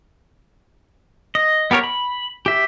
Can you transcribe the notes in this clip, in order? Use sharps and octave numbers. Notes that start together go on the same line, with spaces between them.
D#5
B3 G4 A#4 C#5
B5
G4 E5